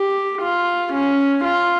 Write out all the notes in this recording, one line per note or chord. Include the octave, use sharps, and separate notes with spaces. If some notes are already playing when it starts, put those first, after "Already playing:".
Already playing: G4
F4
C#4
F4